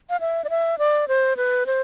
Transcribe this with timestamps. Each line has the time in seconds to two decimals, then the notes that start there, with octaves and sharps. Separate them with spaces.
0.10 F5
0.20 E5
0.44 D5
0.50 E5
0.79 D5
1.08 C5
1.37 B4
1.66 C5